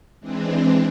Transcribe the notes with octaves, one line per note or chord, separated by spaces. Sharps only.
E3 G#3 C4 D4